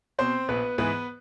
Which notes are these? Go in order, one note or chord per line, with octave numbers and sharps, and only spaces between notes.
B2 C4 C5
A#1 B3 B4
G#2 E3 B3 B4